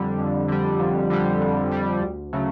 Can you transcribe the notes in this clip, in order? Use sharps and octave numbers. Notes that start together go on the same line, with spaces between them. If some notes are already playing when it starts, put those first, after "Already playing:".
Already playing: F2 D3 G3
F2
D3 G3
F2
D3 G3
F2
D3 G3
D2
C#3 F#3 A3